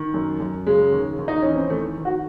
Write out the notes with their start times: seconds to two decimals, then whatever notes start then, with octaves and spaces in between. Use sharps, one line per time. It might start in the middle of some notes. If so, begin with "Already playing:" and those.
Already playing: D#3
0.14 F#2
0.40 F#2
0.67 C#3 G#3
0.93 D#2
1.19 D#2
1.28 D#4
1.42 E3 C#4
1.56 C4
1.70 D#3 A3
1.97 D#3
2.05 F#4